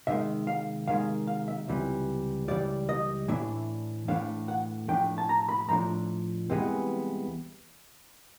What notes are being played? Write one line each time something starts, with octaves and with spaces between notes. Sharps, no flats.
C3 D#3 G#3 E5
F5
C3 D#3 G#3 F5
F5
E5
C#2 C3 E3 G3
C#2 C3 E3 G3 D5
D#5
A2 E3 A3 D4 E5
A2 E3 A3 D4 F5
F#5
A2 F3 A3 D4 G5
A5
A#5
B5
A2 F3 A3 D4 A#5
C2 C3 E3 G#3 B3